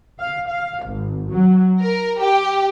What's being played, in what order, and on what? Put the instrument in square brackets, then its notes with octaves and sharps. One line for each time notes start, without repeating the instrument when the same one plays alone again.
[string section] F5
F5
G#1
F#3
A#4
G4